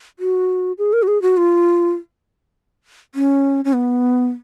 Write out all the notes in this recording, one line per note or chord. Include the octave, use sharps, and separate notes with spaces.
F#4
G#4
A#4
F#4
G#4
F#4
F4
C#4
C#4
B3